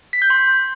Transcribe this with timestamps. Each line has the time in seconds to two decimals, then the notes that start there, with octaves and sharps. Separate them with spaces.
0.13 B6
0.22 G6
0.30 C6